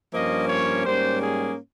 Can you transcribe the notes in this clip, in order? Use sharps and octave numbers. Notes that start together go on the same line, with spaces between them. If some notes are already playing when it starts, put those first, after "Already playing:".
G2 F3 A#3 C#4 D#5
C#5
G#2 G3 A#3 C#4 C5
G#4